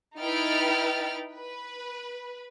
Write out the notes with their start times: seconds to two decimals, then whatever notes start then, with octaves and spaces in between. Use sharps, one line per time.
0.20 D#4 E4 B4 G5 F6 A6
1.36 B4